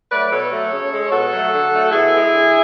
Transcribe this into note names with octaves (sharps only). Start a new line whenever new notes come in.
F#3 A3 B4 D5
B2 A4 C#5
F#3 A3
C#3
G#3
B2 F#4 A4
F#3 A3
D3
F#3 A3
B2 E4 G#4
G#3
D3